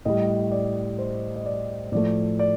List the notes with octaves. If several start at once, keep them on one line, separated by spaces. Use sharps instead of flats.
A2 G3 D#5
D5
C5
D#5
D5
A2 F3 A3 D5
D5